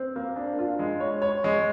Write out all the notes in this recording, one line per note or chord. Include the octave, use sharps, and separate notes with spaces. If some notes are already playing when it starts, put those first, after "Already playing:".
Already playing: C4
A#3
D4
F4
G#3
C#5
C#5
G#3